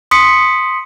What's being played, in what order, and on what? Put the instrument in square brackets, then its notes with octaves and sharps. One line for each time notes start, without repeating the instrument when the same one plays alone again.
[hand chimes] C6 D#6 B6 C#7